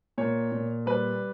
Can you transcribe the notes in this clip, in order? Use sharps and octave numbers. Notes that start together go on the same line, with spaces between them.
A#2 C#5
A#2
G3 B4